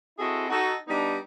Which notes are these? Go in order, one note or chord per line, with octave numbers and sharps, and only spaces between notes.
C4 E4 F#4 G#4 A4 D#5
D#4 F#4 A4
G3 B3 D4 D#4